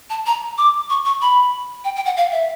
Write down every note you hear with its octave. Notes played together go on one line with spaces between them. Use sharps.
A5
A#5
D6
C#6
C#6
B5
G5
G5
F#5
F5
E5